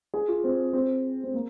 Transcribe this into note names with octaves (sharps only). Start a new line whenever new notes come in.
G#4
F4
C4
C4
C4
A#3